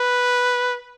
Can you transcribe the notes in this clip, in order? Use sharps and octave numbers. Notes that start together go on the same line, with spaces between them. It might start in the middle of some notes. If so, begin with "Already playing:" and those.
Already playing: B4